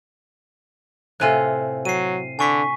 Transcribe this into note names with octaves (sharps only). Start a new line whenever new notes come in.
A2 C3 F4 A4 G#5 F#6
F#3 C7 D#7
D3 G#5 C#6 B6